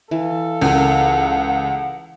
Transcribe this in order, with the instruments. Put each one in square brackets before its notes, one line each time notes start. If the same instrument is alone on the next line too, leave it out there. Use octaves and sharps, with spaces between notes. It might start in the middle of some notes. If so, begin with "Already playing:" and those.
[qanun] E3 [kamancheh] A4 F5
[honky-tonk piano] C#2 [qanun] A#4 G#5 [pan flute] F#5